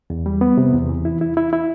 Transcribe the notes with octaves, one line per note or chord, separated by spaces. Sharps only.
E2
G3
B3
C3
E2
E3
E4
E4
E4
E4